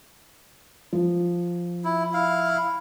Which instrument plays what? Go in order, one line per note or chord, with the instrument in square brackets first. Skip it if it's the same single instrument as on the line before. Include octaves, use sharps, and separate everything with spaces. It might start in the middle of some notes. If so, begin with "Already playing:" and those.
[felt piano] F3
[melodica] E4
E4 F5